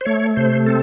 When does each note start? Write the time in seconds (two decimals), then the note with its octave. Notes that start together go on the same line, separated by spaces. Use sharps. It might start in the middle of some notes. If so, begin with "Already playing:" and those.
0.01 C5
0.05 A3 C#5
0.36 C3 C5
0.66 C4 A4